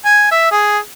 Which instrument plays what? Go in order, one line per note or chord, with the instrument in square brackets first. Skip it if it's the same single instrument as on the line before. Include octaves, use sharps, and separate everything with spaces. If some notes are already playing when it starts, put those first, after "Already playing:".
[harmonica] G#5
E5
G#4